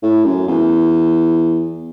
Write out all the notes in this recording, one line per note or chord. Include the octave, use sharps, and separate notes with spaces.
A2
F#2
E2